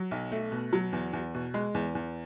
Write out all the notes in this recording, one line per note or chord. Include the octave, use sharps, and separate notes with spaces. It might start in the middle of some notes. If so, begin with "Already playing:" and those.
Already playing: F#3
B1
A3
B2
F#3
E2
E2
B2
G#3
E2
E2